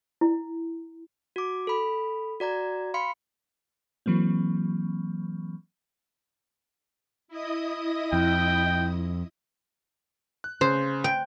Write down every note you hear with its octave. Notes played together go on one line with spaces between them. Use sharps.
E4
F#4 D6
A4 B5
F#4 D5 A#5 G#6
F5 B5 C6 C#7
E3 F#3 A#3 C4
E4 D#5 D#6
F2 G5
F#6
C#3 C5
G5